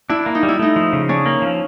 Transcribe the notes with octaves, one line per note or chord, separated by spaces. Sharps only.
D4 E4
A#3
D#4
G3
E4
A3 D#4
F3
C#3
C#4 D4
A#3
F3